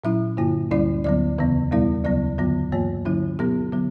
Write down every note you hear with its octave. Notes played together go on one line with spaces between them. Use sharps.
A#2 F#3 C#4 E4 E5
G2 D3 A#3 E4
D2 D3 G3 C#4 E4 D5
D2 D3 F#3 B3 D5
E2 C#3 E3 B3
E2 B2 G3 B3 E4 D5
D2 C#3 F#3 B3 D5
G2 D3 F#3 B3
G2 E3 A#3 C#5
D3 F#3 C#4 E4
B2 F#3 B3 G4
D3 F#3 B3